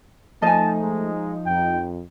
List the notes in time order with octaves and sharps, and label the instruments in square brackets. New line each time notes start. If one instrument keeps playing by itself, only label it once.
[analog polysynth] F3 D#4 [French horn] A3 [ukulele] D#5 G#5 [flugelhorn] A5
[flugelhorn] G#3
[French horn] F2 [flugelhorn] G5